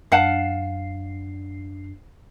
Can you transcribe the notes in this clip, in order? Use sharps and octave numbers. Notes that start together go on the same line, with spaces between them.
F#2 D4 F5 F#5 A5 C7